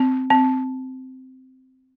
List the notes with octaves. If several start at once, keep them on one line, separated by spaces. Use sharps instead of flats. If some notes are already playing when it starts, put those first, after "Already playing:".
Already playing: C4
C4